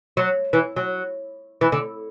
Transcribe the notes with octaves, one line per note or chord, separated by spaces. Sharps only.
F#3
E3
F#3
E3
D3